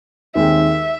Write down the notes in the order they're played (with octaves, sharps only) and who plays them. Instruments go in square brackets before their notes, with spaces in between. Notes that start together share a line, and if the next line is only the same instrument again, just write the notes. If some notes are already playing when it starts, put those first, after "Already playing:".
[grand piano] D#2 D#3 G#3 C4 [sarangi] E5